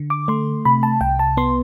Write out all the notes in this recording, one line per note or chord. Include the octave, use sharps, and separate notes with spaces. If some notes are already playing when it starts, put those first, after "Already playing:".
Already playing: D3
D6
A3 C6
C3 B5
A5
C2 G5
A5
B3 C6